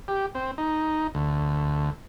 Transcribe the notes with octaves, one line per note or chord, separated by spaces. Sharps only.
G4
C4
D#4
D2